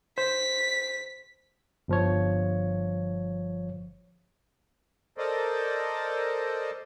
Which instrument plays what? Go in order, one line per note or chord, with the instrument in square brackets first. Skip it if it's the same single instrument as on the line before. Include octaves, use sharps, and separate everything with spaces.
[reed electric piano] C5 [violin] B6
[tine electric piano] G1 F3 C#5
[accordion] A4 A#4 C5 D5 D#5